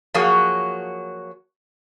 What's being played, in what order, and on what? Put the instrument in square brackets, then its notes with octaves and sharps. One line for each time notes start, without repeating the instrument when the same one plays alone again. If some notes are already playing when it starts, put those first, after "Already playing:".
[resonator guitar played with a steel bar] F3 F#3 A#3 F#4 G#4 C#5